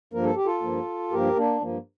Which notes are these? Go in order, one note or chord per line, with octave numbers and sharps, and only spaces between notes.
G2 F3 A#3 A#4
A4
G4
F4 A4
G2 F3 A#3
G2 F3 A#3 G4 A#4
A#3 D4
G2 F3 A#3